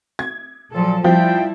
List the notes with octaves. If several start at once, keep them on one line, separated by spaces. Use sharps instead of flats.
G#6
A#2 F3 F#3 A4
F3 G3 E4 C5 G5